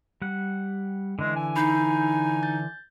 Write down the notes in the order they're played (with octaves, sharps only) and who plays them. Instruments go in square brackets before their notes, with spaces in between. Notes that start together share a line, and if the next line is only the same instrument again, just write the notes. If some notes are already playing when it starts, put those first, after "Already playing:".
[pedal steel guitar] G3 F#5
[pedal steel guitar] D3 E3 [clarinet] G#3
[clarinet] G#5
[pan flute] D#4 [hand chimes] B5 G6 C7
[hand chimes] G6 A6